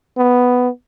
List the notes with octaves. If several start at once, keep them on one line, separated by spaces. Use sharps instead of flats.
B3